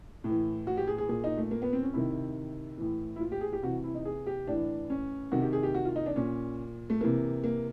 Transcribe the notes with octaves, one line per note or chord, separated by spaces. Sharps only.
A2 E3
F#4
G4
G#4
G#4
A#2 G#4
D#4
A3
A#3
B3
C4
C#4
C3 D#3 E4
A2 E3
E4
F4
G4
G#4
G4
C3 E3 F#4
E4
D#4
G#4
G4
A2 E3 D4
C#4
C3 D#3 F#4
G4
G#4
G4
F#4
F4
D#4
D4
A#2 C#4
A3
C3 E3 A#3
A#3